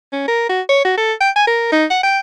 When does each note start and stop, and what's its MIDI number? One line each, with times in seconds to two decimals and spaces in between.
0.13 0.27 61
0.28 0.46 70
0.49 0.61 66
0.69 0.81 73
0.85 0.95 66
0.97 1.13 69
1.20 1.30 79
1.36 1.47 80
1.47 1.69 70
1.72 1.85 63
1.91 2.01 78
2.03 2.19 79